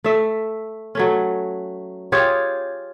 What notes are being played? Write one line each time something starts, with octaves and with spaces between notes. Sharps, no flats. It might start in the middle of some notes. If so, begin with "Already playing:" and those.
A3 E5
F#3 A3 C#4
F4 G4 G#4 C#5